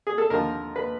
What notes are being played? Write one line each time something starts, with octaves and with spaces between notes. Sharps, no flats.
G#4
A4
D#2 D3 F3 A#4
B4